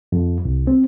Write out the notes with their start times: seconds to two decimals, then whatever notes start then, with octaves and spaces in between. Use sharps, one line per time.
0.12 F2
0.45 C2
0.67 C4